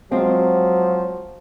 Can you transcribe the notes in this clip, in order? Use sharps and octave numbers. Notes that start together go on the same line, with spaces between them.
F3 F#3 G#3 C4